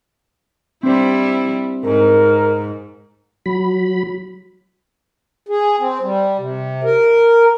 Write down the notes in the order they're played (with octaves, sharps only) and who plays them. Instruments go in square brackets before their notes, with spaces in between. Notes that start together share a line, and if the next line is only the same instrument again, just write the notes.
[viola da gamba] G3 E4 [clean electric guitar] C4 D4 C5
[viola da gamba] G#2 [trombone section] A#4
[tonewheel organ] F#3 B5
[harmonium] G#4
C4
G3
C3
A#4